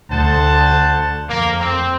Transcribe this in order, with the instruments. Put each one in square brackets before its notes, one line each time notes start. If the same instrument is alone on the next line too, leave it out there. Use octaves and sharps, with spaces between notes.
[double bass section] D2 [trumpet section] C5 F#5 A5
[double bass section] F2 [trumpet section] A#3
[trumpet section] C4